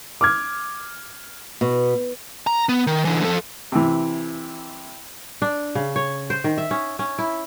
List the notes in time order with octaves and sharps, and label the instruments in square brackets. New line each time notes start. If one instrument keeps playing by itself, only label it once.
[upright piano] D6 F6 G#6
[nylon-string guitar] B2
[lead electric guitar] A#5
B3
D#3
D3 E3
F3 A4
[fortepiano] C3 E3
[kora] D4
C#3
C#5
C5
D#3
E5
C#4
C#4
E4